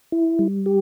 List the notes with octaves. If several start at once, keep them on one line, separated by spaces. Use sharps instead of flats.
E4
G3
G4